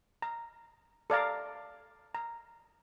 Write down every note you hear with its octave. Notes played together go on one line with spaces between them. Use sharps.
A#5
A4 D5 F5 A#5
A#5